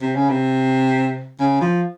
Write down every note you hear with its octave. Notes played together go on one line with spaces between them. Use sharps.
C3
C#3
C3
C#3
F3